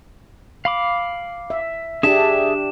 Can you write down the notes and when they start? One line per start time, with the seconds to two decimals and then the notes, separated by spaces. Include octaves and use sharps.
0.65 F5 B5 D6
1.50 E5
2.03 D4 G4 G#4 E5 A5 E7